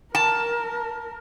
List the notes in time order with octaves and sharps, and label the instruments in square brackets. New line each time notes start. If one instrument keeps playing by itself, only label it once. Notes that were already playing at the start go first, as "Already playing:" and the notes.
[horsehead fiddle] A#4 [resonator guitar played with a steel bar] A5